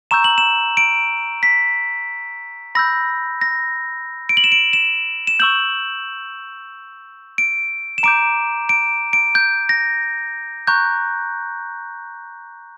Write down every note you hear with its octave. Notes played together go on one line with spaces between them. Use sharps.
A#5 C#6 E6 G6 E7
F#7
E7
D7
B6
B5 E6 G6 A#6
A#6
D7
F#7
E7
D7
E7
E7
C#6 E6 G6 F#7
D7
E7
A#5 D6 G6 D7
D7
D7
G6
A#6
A#5 C#6 F#6 G6